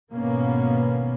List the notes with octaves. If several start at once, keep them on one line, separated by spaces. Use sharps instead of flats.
G#1 B2 A#3 B3 C#4